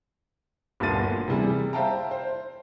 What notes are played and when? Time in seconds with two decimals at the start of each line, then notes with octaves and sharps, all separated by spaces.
0.80 G1 D2 A#2 A4 A6 D#7
1.28 C3 E3 G3 G#4
1.73 C5 E5 F5 G5 A5 A#5
2.11 C5